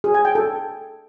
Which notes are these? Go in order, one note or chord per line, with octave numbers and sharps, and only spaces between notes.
G#4
G#5
G5
A4